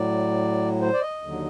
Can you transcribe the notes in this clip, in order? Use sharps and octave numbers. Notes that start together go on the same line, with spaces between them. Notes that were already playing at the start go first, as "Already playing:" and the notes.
Already playing: A2 F#3 D5
C5
D5
D#5
D#2 D3 F#3